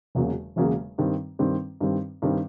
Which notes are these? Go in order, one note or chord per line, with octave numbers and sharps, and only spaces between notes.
E1 E2 C#3 F#3 A#3
E1 E2 C#3 F#3 A#3
G2 D#3 G3 C4
G2 D#3 G3 C4
G2 D#3 G3 C4
G2 D#3 G3 C4